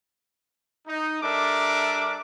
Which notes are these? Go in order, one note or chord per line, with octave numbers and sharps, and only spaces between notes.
D#4
G3 D4 A4 A#4 E5 D6